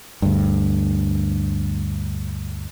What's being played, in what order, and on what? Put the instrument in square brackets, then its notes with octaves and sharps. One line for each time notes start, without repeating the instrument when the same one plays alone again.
[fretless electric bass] D2 G2